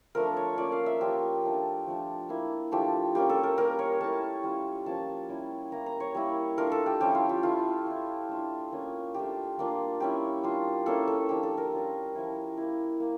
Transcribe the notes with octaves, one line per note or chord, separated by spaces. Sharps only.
F3 A3 D4 A#4
C#5
A#3 C#4 F4 D5
F5
E5
F3 C#4 F4 G4
A3 D4 F4
F3 A3 D4
A#3 E4
F3 A3 D4 F4 G4
G3 A#3 C#4 G4
A4
A#4
G3 A#3 C#4 A#4
C#5
A3 E4 A5
G3 C#4 F4
F3 A#3 C#4 A5
G3 C#4 E4
A#3 E4 A#5
A#5
C#5
G3 A#3 E4
A3 D4 F4 A#4
A4
G4
F3 C#4 E4 G4
F4
G4
A3 E4 F4
A3 E4
A3 D4 F4
A#3 C#4 F4
A3 D4 F4 G4
G3 A#3 D4 F4
G3 C#4 E4 G4
G3 D4 F4
A#3 C#4 E4 A4
A4
F3 A#3 D4 G4
A4
A#4
G3 C#4 F4
F3 C#4 E4
A#3 E4
A#3